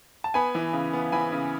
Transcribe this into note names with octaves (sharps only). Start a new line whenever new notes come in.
A5
B3 G#5 B5
E3
C#3
B3
E3 G#5 B5
C#3